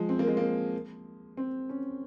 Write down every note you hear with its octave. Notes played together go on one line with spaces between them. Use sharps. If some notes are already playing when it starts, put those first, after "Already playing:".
Already playing: F3 G#3
C4
A#3
G#3
A#3
C4
C#4